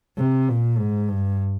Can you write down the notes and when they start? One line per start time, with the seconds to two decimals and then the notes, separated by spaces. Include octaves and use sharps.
0.18 C3
0.49 A#2
0.78 G#2
1.08 G2